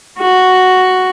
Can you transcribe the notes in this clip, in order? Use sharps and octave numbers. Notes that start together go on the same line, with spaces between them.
F#4